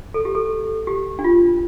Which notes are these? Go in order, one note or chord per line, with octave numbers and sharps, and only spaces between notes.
A4
G4
A4
G4
D4
F4